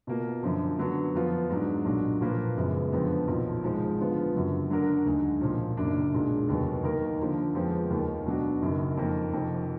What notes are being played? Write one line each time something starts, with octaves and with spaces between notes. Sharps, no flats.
B2 A#3 F4
F#2 D3 F3
D3 F#3 B3
F2 F3 B3 F4
G#2 F#3 D4
B1 A#2 F#3 D4
A#2 F3 A#3 F4 B4
F#1 F#2 F3 G#3 B3
F2 D3 F3 B3
B1 A#2 F3
G#1 G#2 F3 G#3
D3 F3 B3 F4
F#1 F#2 D3 F#3
D3 F#3 D4 F#4 A#4
D2 D3 G#3 D#4 G#4
B1 A#2 F3
F#1 F#2 D#3 A#3 D4
B1 A#2 G#3 D4
F1 D#2 D#3 F#3 B3
D#2 D#3 A#3 D#4 A#4
D3 F3 A#3
F2 F3 G#3 B3
D#2 D#3 A#3
B2 F#3 D4 F#4
F#1 F#2 D#3
F2 D#3 A#3
F1 F2 D#3